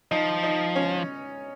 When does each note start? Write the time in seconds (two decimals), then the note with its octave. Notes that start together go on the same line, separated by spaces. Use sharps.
0.11 F3 D#4
0.43 D#4
0.76 C#4